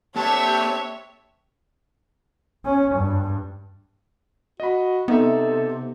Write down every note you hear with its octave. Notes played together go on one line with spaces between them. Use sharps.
A#3 C4 D4 G4 A4 C#5 E5 A5
C#4
G2
F#4 D#5 B5
C3 B3 C4 D#4 A4 E5